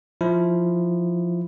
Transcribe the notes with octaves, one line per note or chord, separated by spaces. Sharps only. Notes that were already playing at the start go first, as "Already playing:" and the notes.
F3 E4